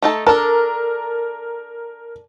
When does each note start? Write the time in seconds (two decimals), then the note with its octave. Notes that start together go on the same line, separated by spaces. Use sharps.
0.02 A3 D#4 A4
0.26 D4 A4 A#4